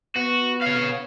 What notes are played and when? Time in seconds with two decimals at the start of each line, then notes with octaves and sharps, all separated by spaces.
0.16 B3 F#4
0.61 C#5 F5